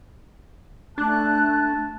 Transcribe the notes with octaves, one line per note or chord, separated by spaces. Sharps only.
A3 D4 A5 F#6